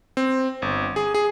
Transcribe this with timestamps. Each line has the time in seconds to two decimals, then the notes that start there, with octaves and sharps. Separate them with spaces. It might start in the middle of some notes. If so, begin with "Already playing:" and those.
0.17 C4
0.62 G1
0.96 G#4
1.14 G#4